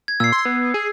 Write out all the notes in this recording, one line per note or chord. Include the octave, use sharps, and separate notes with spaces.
G#6
A#2 E6 C7
C6
B3
G#4